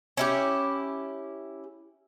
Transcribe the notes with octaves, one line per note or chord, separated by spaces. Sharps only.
C#4 E4 G4